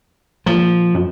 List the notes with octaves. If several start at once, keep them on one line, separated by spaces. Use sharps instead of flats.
A#2 F3
F#2